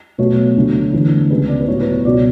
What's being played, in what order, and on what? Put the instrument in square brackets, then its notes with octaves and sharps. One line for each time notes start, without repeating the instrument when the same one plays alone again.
[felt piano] B2 F#3 A3 C#5
D2 D3 F#3
E2 D3 A3
C#2 C#3 G#3 B3 B4
D5
B4
A2 F#3 B3 C#5
B4
C#5
C#2 B2 F#3 B3 D5